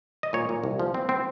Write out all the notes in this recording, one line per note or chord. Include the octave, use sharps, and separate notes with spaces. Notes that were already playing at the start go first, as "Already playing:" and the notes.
D#5
A#2 C#5
A#2
C2
F3
C4
C4